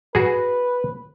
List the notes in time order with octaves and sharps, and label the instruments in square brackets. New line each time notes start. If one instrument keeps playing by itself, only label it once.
[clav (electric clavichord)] F#4 G#4 [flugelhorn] B4